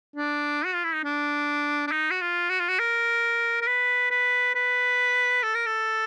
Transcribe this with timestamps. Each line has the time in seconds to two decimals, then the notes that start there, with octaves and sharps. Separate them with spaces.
0.16 D4
0.65 F#4
0.75 F4
0.84 E4
0.94 D#4
1.04 D4
1.87 D4
1.92 D#4
2.11 F#4
2.21 F4
2.50 F#4
2.60 F4
2.69 F#4
2.79 A#4
3.62 A#4
3.67 B4
4.11 B4
4.55 B4
5.43 A4
5.55 A#4
5.66 A4